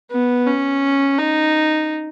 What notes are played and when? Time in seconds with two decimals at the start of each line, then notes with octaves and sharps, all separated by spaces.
0.11 B3
0.47 C#4
1.18 D#4